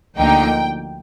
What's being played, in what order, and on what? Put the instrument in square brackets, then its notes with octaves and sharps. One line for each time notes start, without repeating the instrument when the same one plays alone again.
[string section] D2 D3 F3 A#3 D#4 G5